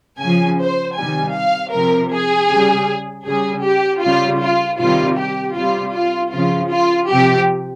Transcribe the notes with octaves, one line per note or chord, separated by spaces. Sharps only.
C#3 F3 G#5
C5
C3 D#3 G3 G#5
F5
C3 F3 A#4
G#4
C#3 G3
C#3 G3 G#4
G4
C#3 G3 F4
F4
C3 D#3 G3 F4
G4
C3 G3 F4
F4
C#3 F3 F4
F4
C3 F3 G4